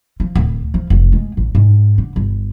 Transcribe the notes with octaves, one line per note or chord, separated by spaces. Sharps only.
F3
D1
F3
F1
G#3
A1
G#2
D3
G1